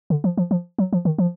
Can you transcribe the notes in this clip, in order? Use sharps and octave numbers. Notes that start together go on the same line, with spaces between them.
D3
F3
F3
F3
F#3
F3
D#3
F3